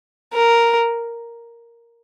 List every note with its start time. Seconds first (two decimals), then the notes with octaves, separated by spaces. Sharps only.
0.34 A#4